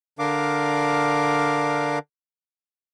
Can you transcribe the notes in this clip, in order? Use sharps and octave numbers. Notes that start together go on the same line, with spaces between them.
D3 D4 A#4 F5 D6